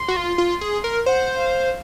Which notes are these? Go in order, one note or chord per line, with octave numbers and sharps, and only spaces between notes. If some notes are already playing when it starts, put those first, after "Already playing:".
Already playing: C6
F#4
F4
F4
G#4
A#4
C5 F#5
F5